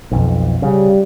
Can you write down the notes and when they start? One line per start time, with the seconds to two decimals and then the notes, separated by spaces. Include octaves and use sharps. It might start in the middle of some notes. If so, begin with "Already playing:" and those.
0.11 B1 F2
0.62 C#3 G3